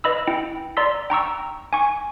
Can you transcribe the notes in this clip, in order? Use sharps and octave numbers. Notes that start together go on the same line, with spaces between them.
B4 D#5 B5 E6
E4 G5
D5 A#5 C6 E6 B6
G5 A#5 C#6 E6
G#5 C#6